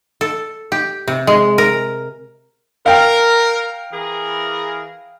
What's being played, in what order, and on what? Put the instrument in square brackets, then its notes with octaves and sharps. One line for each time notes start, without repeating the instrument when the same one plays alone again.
[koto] A4
G4
C3
G#3
A#4
[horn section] A#4 [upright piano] F5 G5
[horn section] E3 G#4 A#4